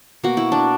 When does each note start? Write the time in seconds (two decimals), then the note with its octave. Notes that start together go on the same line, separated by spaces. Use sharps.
0.24 B2 A#3 F#4
0.37 E4
0.52 D4